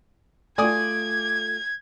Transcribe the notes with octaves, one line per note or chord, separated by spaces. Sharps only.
A3 F4 D5 G#5 D#6 G#6